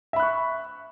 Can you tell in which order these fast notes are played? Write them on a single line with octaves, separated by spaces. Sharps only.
E5 B5 F#6 C#6